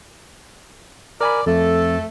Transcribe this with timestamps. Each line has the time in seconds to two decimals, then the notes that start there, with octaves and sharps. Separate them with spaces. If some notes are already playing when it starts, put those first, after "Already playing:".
1.21 A#4 D5 G#5 B5
1.46 F2 A3 A4